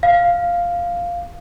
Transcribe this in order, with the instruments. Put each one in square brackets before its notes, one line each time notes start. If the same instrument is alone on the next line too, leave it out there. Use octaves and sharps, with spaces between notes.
[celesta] F5